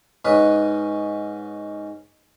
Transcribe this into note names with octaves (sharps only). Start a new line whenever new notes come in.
G#2 C#4 B4 D#5